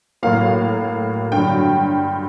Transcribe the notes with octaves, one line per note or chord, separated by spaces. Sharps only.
A2 F#3 A#3 F5
G2 D3 F#3 G5